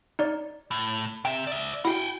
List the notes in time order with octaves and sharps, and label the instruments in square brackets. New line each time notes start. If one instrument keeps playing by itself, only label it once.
[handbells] D#4 C#5 D5
[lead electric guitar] A2
[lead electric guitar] C3 E5 [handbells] G5
[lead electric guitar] D5 E5
[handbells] E4 F#4 [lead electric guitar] F#5 G5